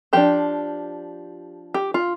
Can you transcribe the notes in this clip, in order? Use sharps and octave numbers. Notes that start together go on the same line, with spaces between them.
F3 D4 G4
G4
F4